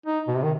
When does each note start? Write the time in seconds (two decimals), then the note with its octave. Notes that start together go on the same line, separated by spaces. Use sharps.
0.06 D#4
0.28 B2
0.36 C3
0.43 D#3